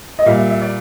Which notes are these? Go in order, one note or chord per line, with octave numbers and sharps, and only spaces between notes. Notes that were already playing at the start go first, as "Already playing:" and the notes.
D#5
A#2 G3 E5
E5
E5
D5